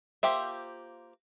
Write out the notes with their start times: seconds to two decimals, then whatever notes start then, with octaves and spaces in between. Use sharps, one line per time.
0.23 A#3 F4 G4 C5 E5